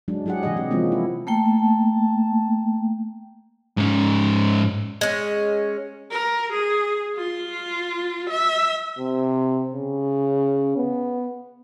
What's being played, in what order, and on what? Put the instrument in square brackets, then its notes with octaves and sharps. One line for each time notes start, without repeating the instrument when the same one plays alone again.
[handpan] F#3 G#3 D4
F#3 E4 G4 G#4 F#5
C3 E3 G4 G#4 D#5
G4
E3 F3 G#3 A#3 C4 C#4
E4
[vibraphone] A3 A#3 G5 [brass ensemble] A5
[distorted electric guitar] G#2 C#4
[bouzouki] G#3 C#4
[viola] A#4
G#4
F4
E5
[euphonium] C3
C#3
B3